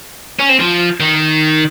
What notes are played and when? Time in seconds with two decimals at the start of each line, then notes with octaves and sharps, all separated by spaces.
0.40 C#4
0.50 C4
0.60 F3
1.00 D#3